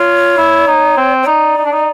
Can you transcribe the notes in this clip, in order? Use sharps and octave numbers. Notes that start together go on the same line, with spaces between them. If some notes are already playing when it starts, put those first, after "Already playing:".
Already playing: F4 C#5
E4
D#4
C4
C#5
D#4 D5
D#4
D4
D#4